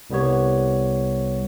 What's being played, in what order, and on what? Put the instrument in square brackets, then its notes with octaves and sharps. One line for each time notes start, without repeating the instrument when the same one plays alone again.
[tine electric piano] C2 G3 B3 C#5